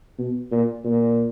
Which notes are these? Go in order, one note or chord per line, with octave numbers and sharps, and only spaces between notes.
B2
A#2
A#2